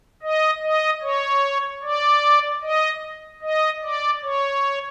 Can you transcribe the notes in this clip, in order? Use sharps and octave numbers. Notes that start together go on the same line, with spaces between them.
D#5
D#5
C#5
D5
D#5
D#5
D5
C#5